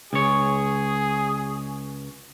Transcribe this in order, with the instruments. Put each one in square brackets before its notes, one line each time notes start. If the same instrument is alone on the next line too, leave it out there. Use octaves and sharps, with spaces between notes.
[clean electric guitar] C#2 C#5 [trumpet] G#4